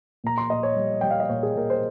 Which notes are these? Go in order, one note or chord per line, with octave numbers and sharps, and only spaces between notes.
A#2 A#5
C6
A#2 D#5
C#5
G3
G3 G5
F5
D#5
A#2 C#5
G#4
A#2 A#4
C5